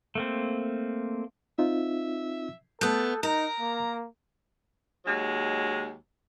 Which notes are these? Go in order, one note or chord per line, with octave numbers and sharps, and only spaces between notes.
A3 A#3 C4
C4 D#4 F4 E5
A3 B3 A4 A5 D#6 F#6 G6
D#4 A#4 A#5
A#3
D#2 F#3 G#3